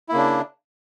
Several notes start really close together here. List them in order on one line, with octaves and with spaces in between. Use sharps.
E4 A#3 C#3 D4